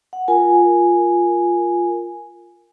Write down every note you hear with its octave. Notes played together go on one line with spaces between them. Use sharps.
F#5
F4 A#4 G#5